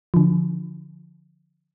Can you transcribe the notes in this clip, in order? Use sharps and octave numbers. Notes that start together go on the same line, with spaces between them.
D3 F3